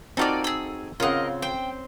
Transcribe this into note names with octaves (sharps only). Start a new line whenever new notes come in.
A#3 C4 D#4 F4 F#4 A4 D5
G#4 E6
C#3 C4 F4 A#4 D#5 F#5
C5 G5